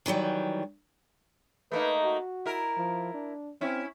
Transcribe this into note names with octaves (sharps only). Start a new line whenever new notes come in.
D#3 E3 F#3 G3
A3 A#3 D#4 B4
F#4
E4 A#4
F3
D4
C4 C#4 E4